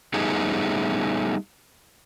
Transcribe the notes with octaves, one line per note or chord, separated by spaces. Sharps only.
G3 A3 B3 C#4 D#4 G#4